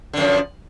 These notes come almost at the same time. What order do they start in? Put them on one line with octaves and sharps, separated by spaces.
D3 F#2 F3